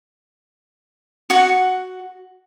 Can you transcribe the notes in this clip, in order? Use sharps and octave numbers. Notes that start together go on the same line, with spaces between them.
F#4 F#5